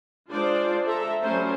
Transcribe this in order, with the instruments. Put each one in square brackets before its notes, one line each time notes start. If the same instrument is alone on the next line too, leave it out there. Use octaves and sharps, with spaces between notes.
[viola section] G#3 D4 F4 G#4 C5 D5
A4 E5 A#5
F#3 G3 A3 C#4 C5